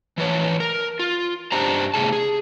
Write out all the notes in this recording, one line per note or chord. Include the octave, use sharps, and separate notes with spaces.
E3 F3 B4 C#5
A#4
F4
G2 D4 G4 C5 A5 A#5
A2 C3 G#4 A5
G#4